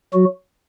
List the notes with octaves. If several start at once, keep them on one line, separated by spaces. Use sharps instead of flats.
F#3 F#4